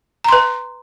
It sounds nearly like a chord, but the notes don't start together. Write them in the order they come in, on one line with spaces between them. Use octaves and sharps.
A#5 C6 B4